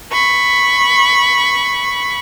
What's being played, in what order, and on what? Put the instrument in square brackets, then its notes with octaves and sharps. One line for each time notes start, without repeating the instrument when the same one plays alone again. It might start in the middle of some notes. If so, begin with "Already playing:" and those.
[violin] B5 C#6